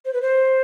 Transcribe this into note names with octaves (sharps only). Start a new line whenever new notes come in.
C5
B4
C5